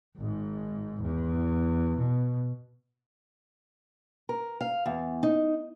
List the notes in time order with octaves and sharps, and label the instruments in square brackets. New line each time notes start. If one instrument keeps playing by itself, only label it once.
[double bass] G#1 G#2
E2
B2
[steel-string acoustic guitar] A#4
F5
E2
D#4